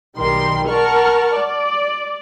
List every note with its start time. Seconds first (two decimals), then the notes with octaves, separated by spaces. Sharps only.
0.17 B1 D#3 G3 G4 A#4 C6
0.69 A#4 F#5 A5 C#6 F6
1.35 D5